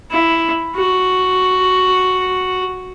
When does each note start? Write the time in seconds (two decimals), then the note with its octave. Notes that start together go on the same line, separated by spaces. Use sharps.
0.11 E4
0.76 F#4